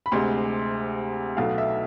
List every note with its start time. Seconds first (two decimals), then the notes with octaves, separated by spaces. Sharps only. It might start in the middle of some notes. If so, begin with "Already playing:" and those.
0.06 B5
0.12 D2 C3 G#3 C6
1.37 B1 B2 A3 F5
1.58 E5